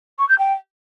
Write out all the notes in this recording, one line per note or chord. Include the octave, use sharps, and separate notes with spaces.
C#6
G6
G5